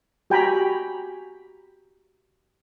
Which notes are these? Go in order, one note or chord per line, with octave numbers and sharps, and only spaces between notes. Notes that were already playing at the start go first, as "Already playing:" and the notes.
F#4 G4 G5 G#5 A#5 B5